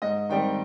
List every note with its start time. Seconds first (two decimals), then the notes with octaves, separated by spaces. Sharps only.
0.02 G#2 D#5
0.29 D#3 G3 C4 G5